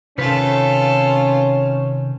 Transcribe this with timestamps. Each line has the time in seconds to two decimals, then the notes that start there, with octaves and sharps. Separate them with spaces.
0.18 C3 D#3 C#4 F4 A4 B4